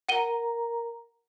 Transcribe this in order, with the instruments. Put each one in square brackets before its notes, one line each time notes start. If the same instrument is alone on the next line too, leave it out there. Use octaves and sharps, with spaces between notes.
[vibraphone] A#4 A#5 [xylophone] F#5 D#7 G7